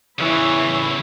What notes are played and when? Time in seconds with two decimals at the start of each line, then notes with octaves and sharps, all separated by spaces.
0.19 E2 C#3 E3 E4 C#5